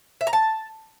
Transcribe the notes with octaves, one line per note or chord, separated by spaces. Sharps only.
E5
A#5
A5